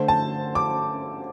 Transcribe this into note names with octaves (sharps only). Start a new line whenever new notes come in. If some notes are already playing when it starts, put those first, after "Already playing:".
Already playing: D3 A3 C5
A5
D6